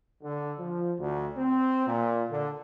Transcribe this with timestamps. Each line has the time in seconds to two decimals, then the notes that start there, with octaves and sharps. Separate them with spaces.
0.23 D3
0.59 F3
0.99 D2
1.36 C4
1.87 A#2
2.30 D3